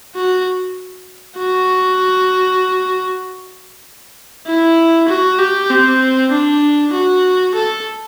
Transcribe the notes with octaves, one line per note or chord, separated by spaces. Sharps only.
F#4
F#4
E4
F#4
G4
C4
D4
F#4
A4